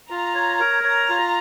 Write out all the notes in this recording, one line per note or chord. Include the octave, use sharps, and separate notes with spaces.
F4 A#5
C#5
A#4
C#5 A#5
F4